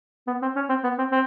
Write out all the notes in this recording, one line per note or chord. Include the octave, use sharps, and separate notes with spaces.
B3
C4
C#4
C4
B3
C4
C4